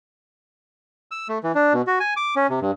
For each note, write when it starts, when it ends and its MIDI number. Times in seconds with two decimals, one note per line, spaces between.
1.11 1.28 88
1.29 1.38 57
1.44 1.52 52
1.55 1.73 62
1.74 1.82 47
1.87 1.99 66
2.00 2.14 80
2.17 2.34 86
2.36 2.47 61
2.50 2.59 48
2.62 2.71 43